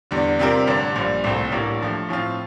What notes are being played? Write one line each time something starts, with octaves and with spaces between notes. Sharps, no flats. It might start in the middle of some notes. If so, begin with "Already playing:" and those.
E2 D3 G3
C3 G3 C4 F4 A#4
A1 G2 D3 G3 D4
A#1 A#2 G3
C2 A#2 A3 C4
A1 A2 G3 A#3 D4
G2 F3 A3
A2 F3 C4 F4